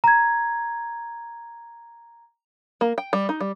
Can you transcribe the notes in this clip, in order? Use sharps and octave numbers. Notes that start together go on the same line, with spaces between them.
A#5 G#6
A#3
G5
G3
D#4
G3